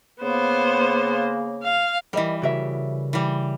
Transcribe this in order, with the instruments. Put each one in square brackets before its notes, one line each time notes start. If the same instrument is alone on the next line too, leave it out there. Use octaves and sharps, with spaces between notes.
[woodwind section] C#3 A#3 [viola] B3 C5
[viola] F5
[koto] E3 G3 [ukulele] A#4 D#5
[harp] C#3 [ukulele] F#4 A#4 E5
[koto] E3 G3